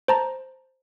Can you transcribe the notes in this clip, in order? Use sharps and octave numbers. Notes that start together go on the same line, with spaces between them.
C5 A5 A#5